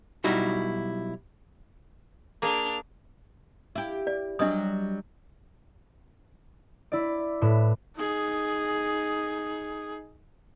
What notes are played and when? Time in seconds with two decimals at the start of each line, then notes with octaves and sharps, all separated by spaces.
0.24 B1 G3 D#4 E4 F#4
2.42 A#3 D4 G#4 F7
3.75 E4 G4
4.07 D5
4.39 F#3 G3 D4 D#5 D#6
6.92 E4 D5
7.41 A2 B4 E7
7.96 D#4 G#4